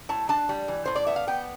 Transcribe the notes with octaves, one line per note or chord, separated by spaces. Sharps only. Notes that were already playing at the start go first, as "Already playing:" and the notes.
A2 A5
D4 A5
G3
E3
A2 C5
D5
B3 E5
F5
B3 G5